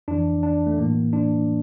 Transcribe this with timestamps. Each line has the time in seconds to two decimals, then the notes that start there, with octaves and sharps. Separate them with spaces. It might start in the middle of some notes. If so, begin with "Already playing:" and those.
0.08 F2 E3 D4
0.43 D4
0.67 A3
0.78 A2 E3 A#3
1.13 D4